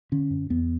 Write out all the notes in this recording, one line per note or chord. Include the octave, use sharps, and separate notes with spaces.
D3 C#4
F#2
E2 B3